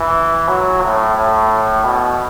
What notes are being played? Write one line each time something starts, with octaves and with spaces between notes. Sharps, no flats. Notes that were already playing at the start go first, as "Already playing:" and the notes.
Already playing: E3
F#3
A2
A2
B2